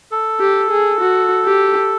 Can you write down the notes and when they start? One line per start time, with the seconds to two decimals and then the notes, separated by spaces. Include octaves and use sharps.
0.12 A4
0.40 G4
0.71 G#4
1.01 F#4
1.45 G4